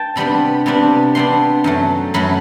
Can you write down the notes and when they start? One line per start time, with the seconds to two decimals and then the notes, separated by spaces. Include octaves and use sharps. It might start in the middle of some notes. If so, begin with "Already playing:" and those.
Already playing: G5 A5
0.16 C3 G3 B3 D4 B5
0.66 C3 G3 B3 D4
1.15 C3 G3 B3 D4 C6
1.64 F#2 F#3 A3
2.14 F#2 F#3 A3 B5